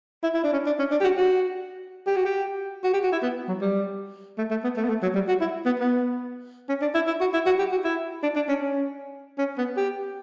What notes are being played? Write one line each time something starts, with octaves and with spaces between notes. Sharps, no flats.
E4
E4
D4
C#4
D4
C#4
D4
G4
F#4
F#4
G4
F#4
G4
F#4
G4
F#4
E4
B3
F#3
G3
A3
A3
B3
A3
B3
A3
F#3
G3
F#4
E4
B3
B3
C#4
D4
E4
E4
F#4
E4
F#4
G4
F#4
E4
D4
D4
C#4
C#4
C#4
B3
G4